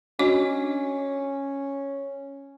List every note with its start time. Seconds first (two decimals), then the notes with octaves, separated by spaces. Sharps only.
0.19 C#4 D4 F#4 D#5